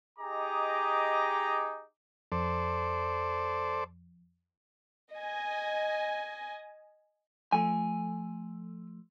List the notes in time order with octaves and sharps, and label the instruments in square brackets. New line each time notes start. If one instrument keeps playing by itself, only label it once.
[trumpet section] D#4 G4 G#4 D#5 A#5 D6
[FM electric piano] F2 [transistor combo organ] A4 C5 D5
[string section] D#5 G#5
[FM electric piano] F3 A3 [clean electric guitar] G#5